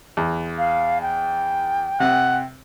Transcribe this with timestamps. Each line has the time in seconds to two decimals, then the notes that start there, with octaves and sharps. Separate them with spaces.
0.17 E2
0.58 F5
1.02 G5
2.00 C3 F#5